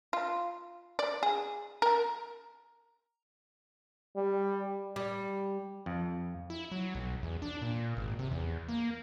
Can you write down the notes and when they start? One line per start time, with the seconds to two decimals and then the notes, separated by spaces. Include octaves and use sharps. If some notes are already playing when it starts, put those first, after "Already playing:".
0.13 F4
0.99 D5
1.23 G#4
1.82 A#4
4.16 G3
4.96 G3
5.86 F2
6.50 E4
6.72 F#3
6.95 B1
7.23 E2
7.42 D4
7.62 A#2
7.97 G#1
8.19 C3
8.31 E2
8.69 A#3